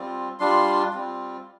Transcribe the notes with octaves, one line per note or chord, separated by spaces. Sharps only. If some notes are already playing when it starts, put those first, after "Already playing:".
Already playing: G3 C4 F4
G3 D4 F4 C6
G3 C4 F4